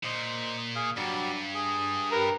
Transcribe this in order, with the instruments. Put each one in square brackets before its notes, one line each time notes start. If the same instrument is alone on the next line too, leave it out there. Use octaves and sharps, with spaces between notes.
[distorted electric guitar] A#2 [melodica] C5 D#5
[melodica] G#4 F5
[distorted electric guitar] G2 [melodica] F#3 G3 D5
[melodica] G#4
[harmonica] G4 A#4 [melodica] B4